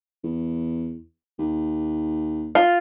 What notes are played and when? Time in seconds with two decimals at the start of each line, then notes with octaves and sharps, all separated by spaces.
0.24 E2
1.39 D#2
2.55 F4